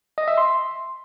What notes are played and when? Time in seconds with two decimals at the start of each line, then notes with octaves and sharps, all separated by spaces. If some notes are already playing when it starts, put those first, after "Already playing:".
0.18 D#5
0.28 E5
0.38 C6